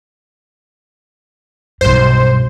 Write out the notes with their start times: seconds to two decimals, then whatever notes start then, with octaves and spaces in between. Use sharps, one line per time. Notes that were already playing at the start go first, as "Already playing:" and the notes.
1.81 B1 G2 C5